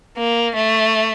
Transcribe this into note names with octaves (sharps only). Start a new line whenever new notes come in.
A#3
A3